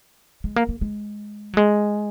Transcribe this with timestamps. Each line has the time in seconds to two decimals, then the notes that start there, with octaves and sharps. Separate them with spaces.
0.44 G#3
0.56 A#3
0.69 A#3
0.81 G#3
1.54 F#3
1.57 G#3